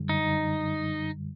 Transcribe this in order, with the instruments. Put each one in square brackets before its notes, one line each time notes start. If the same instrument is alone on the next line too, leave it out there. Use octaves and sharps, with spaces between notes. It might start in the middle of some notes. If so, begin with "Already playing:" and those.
Already playing: [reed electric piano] F#2 D3 G3
[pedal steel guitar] D#4